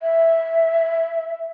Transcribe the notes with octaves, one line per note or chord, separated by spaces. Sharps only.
E5